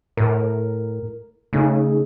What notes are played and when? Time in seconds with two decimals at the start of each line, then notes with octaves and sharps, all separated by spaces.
0.17 A2 A#4
1.53 C#3 A3 D#4 G#4